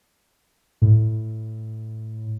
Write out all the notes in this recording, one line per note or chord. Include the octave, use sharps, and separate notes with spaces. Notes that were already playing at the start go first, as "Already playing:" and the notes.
A2